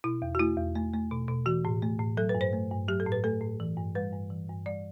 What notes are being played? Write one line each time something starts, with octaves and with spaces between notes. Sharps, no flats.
B2 E4
E2
F#4
A3 E4
E2
A3
A3
B2
B2
E3 F#4
A2
A3
A2
F#3 A4
B4
G2
C5
A3
G2
F#3 G4
A4
A2
B4
A3 A4
A2
E3
G2
G3 B4
G2
E3
G2
G3 D5